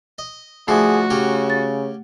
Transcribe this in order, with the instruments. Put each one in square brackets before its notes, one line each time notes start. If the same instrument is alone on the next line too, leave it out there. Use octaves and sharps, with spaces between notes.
[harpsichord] D#5
[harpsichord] D3 F3 E4 [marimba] A3 [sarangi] F#4 [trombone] G#4
[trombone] C#3 [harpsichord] C#4 G4 A#5
[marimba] A6